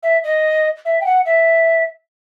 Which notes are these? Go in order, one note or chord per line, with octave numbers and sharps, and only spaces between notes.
E5
D#5
E5
G5
F#5
E5